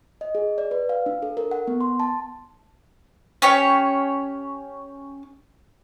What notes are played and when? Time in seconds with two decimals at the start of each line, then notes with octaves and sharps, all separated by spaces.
0.21 D#5
0.35 G#4
0.58 D5
0.71 B4
0.89 F5
1.06 D4
1.22 A4
1.37 A#4
1.51 F#5
1.68 B3
1.81 C6
2.00 A5
3.42 C#4 G4 C#5